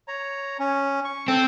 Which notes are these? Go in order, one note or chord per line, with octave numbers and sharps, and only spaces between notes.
C#5 A#5
C#4
C#6
C4 A4